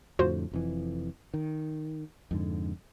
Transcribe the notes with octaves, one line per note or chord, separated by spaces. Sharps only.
F2 A2 D3 F4 F#4 C5
F1 F2 E3
D#3
F2 G#2 D3